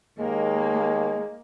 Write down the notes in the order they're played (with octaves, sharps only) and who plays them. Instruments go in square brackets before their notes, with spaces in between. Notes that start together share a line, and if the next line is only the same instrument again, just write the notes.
[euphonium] D#2 [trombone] G#3 [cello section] A#3